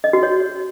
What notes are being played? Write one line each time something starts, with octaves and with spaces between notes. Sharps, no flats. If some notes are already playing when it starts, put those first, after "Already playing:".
D#5
F#4
C#5